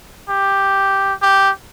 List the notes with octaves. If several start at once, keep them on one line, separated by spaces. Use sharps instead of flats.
G4
G4